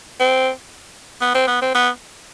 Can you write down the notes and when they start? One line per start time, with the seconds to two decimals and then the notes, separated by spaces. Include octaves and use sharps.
0.20 C4
1.21 B3
1.34 C4
1.47 B3
1.62 C4
1.74 B3